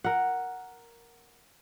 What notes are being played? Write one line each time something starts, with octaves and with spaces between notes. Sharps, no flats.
A#4 F#5